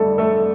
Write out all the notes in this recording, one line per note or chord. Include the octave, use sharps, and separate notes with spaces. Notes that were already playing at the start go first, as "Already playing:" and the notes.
Already playing: F2 D3 G3 A3 A4
A3 A4